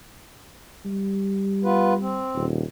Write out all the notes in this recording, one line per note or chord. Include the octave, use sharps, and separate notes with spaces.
G3
B3 F4 B4
C4
D#1